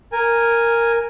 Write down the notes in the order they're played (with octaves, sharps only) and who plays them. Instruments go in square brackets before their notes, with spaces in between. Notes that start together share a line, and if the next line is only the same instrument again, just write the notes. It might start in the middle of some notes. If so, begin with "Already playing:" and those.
[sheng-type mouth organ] A#4 G#5